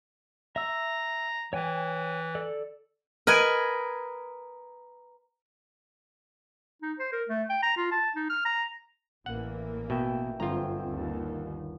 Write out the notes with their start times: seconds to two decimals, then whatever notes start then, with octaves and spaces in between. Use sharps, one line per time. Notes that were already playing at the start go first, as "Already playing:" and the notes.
0.56 E5 A#5 E6
1.53 E3 C#5 G5 G#5
2.35 A4 D5
3.27 A#4 B4 D#5 G#5
6.82 D#4
6.99 C5
7.12 A#4
7.29 A3
7.50 G5
7.63 A#5
7.77 F4
7.92 A5
8.16 D#4
8.30 F6
8.45 A#5
9.26 A1 E3 A#3 F#5
9.90 B2 E5 G5
10.40 G1 F#2 C4 F4 A#5
10.87 D#2